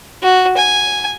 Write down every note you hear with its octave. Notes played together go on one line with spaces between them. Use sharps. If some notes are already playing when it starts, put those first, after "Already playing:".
F#4
G#5